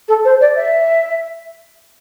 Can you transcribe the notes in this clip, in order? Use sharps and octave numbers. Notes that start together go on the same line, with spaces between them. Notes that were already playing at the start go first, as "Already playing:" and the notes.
A4
C5
D5
E5